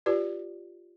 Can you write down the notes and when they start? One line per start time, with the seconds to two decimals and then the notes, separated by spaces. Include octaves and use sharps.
0.06 F4 G4 B4 D5